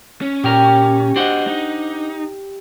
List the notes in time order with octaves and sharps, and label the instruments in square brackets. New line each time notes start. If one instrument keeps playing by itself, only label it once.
[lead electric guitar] C#4
[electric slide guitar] A#2 A#4 [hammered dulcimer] G4
[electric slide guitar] D4 C5 F#5 [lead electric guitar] F#4 D#5
[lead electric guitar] D#4